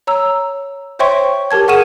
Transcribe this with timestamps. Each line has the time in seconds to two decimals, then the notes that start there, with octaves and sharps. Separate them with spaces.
0.07 C#5 A#5 E6
0.99 C5 C#5 E5 G5 C6 C#6
1.51 G4 A#4 A5 G#6
1.68 G#4 F#5 C#6 F6 D#7 E7